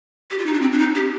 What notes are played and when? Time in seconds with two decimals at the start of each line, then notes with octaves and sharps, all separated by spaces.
0.31 G4
0.38 F4
0.46 D#4
0.53 D4
0.62 C4
0.72 D4
0.79 D#4
0.95 G4